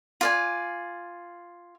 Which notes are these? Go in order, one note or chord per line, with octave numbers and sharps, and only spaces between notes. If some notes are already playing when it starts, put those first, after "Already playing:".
F4 D5 G#5